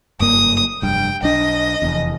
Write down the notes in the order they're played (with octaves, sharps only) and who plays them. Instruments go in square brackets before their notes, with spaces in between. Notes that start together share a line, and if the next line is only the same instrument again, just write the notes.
[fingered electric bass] F#1 G2 A#3 [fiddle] D#6
[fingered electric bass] F1 G2 [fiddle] G5
[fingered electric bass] B1 D4 [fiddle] D#5
[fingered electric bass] F1 E2